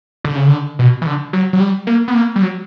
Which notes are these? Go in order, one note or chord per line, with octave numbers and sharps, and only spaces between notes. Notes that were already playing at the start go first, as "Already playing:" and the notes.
D3
C#3
D3
B2
E3
D3
F#3
F#3
G3
A#3
B3
A#3
G3
F#3